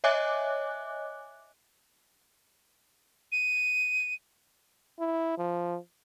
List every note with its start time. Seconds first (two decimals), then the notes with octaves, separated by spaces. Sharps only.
0.04 C#5 D#5 E5 G#5 D6 F#6
3.32 D#7
5.00 E4
5.38 F3